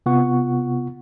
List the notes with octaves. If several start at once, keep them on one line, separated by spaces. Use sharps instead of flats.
C3 B3 F4 F#5 C#6